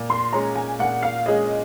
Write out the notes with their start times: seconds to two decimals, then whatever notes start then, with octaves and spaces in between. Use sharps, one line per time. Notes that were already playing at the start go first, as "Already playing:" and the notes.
Already playing: A#2
0.10 C6
0.32 G#3 C#4 G#4 A#5
0.56 G#5
0.79 A#2 F#5
1.03 F5
1.26 G#3 C#4 G#4 D#5